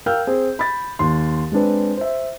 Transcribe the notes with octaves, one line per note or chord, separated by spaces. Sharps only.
A#4 F5 G5 E6 F6 G6
C4 G#4 C5
B5 A6
D#2 C6
G#3 C4 D4 B4
C5 E5